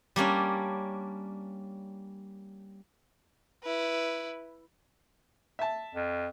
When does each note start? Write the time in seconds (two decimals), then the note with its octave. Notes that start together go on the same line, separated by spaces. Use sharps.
0.16 G3 A#3 C#4 D4
3.63 E4 B4
5.59 E5 A5
5.95 F2